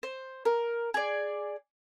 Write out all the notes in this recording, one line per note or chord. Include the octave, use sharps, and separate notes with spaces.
C5
A#4
G#4 D5